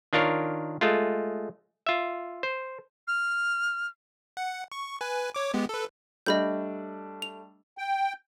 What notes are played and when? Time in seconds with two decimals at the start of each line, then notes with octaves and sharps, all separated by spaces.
0.13 D#3 D4 F4 A#4 C#5
0.81 G#3 A3 F4
1.87 F4 E5
2.43 C5
3.08 F6
4.37 F#5
4.72 C#6
5.01 B4 G#5
5.34 C#5 D6
5.54 G#3 B3 G4
5.69 A4 B4
6.26 G3 A3 D4 D#5 B5 G6
7.22 F7
7.78 G5